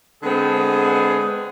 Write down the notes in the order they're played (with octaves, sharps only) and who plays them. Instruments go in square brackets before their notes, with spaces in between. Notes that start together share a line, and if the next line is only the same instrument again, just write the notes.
[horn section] D3 G#3 B3 C4 G#4